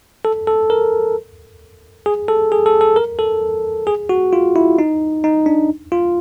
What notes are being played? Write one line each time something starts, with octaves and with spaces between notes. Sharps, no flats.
A4
A4
A#4
G#4
A4
G#4
A4
A4
A#4
A4
G#4
F#4
F4
E4
D#4
D#4
D4
F4